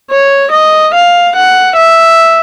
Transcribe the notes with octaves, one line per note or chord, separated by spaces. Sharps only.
C#5
D#5
F5
F#5
E5